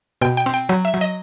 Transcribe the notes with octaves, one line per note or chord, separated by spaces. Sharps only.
B2 G5
G5
C4
G5
F#3
E5
F#3
D#5